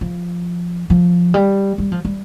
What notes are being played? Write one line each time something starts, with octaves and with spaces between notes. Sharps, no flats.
F3
F3
G3
G3
F3
G3